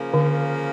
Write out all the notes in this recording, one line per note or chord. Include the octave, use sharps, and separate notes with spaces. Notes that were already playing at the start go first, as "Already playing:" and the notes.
Already playing: C#3 F3 A#3
D3